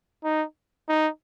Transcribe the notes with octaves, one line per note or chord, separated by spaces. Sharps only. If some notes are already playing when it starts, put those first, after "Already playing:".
D#4
D#4